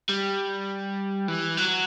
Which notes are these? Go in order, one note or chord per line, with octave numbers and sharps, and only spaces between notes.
G3
E3
F#3